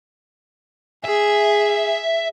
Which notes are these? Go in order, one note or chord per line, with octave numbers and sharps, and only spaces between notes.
G#4 E5